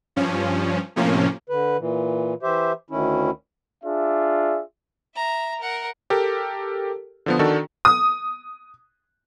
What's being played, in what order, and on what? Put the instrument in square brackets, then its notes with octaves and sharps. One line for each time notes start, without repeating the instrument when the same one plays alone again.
[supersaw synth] G2 F3 C#4
A2 C3 F3 A#3 C#4
[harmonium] D3 B4
A#2 E3
E3 G4 C5 E5
D2 D#3 C#4 E4
[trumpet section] D4 F4 G#4 D5 E5
[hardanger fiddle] E5 A#5
A#4 F#5
[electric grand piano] G4 A4 A#4
D3 F3 B3
D#3 D4 F#4 A4
[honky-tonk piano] D#6